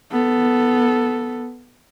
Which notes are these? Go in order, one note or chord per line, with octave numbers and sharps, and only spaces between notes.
B3 A4